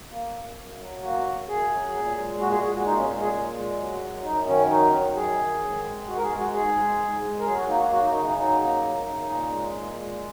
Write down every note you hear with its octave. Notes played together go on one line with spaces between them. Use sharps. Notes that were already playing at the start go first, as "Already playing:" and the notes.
A#3
F#2
F#2
F#3
A#3 F#4
F#2
F#2 G#4
F#3
A#2
G#3
A#2 F#4
G#4
G#3 G#4
F#4
A#2 D#4
C#4
G#3
G#4
A#2
G#3
F#3
F#2
F#2 D#4
D#3 C#4
F#3 D#4
F#2
F#2 G#4
D#3
G#2
G#3
G#2 F#4
A#4
G#4
G#3
F#4
G#2 G#4
G#3
G#2
G#3
A#4
F#3 G#4
F#4
A#3 D#4
F#4
F#2 F#4
D#4
C#3 D#4
D#4
F#3 D#4
A#3
F#2
C#3
A#2
G#3
A#2
G#3